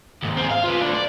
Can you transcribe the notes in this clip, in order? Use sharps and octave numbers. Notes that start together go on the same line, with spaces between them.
D#2 G#2
C4 G#4
F5
F4 B4
A3 D4
D5